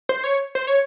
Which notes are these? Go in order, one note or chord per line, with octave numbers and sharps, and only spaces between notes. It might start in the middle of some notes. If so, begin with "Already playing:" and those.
C5
C#5
C5
C#5